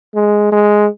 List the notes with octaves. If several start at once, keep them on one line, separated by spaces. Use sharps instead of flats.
G#3
G#3